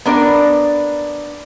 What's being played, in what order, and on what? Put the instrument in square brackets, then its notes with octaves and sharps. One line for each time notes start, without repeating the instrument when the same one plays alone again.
[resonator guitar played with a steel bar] B3 D4 A#4 D5